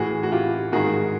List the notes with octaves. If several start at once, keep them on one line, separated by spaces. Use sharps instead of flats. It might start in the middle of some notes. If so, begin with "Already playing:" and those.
Already playing: A2 E3 F#4 G#4
F#4
F4 G4
G#2 D#3 F#4 G#4